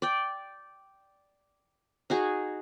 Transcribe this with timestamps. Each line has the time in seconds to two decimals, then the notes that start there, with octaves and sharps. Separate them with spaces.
0.02 D5 G5
2.10 D#4 F#4 G#4